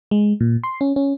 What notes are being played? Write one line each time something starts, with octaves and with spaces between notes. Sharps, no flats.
G#3
A#2
C6
C#4
C#4